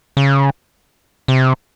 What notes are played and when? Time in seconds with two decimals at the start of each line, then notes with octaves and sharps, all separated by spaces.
0.17 C#3
1.28 C3